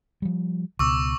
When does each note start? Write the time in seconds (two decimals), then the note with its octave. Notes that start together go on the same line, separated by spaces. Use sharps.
0.22 F3 G3
0.79 C#2 B2 C#6 D6 E6